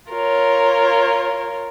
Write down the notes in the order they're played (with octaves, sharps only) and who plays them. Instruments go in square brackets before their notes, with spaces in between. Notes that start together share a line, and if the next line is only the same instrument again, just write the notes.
[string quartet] F4 A#4 C#5